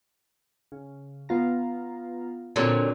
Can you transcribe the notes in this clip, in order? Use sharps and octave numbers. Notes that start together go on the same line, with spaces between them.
C#3
B3 F4 A#5
A#2 D3 F#3 C4 D4